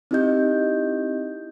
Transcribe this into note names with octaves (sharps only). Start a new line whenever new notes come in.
C4 D#4 E4 G4 D#5 G6